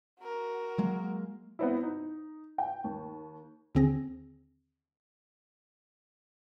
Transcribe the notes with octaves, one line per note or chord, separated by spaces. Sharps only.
F#4 A#4
F#3 G#3 A#3
B3 C4 E4
D#4
G5
D#2
D#2 D3 C4 G#4 A#6